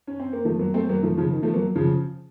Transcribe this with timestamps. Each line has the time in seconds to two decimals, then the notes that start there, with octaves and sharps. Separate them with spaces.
0.07 C#4
0.20 C4
0.33 A#3
0.45 F3 A3
0.59 F#3 A#3
0.74 A3 C4
0.89 F#3 A#3
1.03 F3 A3
1.17 C#3 F3
1.32 D#3
1.43 F3 A3
1.54 F#3 A#3
1.76 C#3 F3